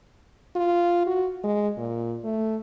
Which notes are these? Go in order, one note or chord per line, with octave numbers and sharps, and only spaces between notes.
F4
F#4
G#3
A#2
A3